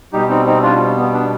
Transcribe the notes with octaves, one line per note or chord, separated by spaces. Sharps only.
B2 G3 D#4 G4
C4 D#4
C4 D#4
D4 F4
B3
B3 D4